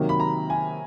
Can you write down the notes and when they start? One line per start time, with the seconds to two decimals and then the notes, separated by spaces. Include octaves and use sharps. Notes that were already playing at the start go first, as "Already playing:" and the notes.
Already playing: C3 D#3 F#3 A#3
0.09 B5
0.20 A#5
0.50 G#5